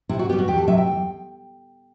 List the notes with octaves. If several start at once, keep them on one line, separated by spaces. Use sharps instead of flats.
C3 E4
F#4
G3 B3 G4
F#4
E2 G4
A4
C3 F#3 E5
G5
E2